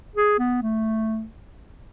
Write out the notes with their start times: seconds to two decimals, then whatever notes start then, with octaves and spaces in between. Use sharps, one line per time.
0.16 G#4
0.39 B3
0.62 A3